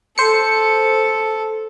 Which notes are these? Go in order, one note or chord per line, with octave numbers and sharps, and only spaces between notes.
A4 C5 C#7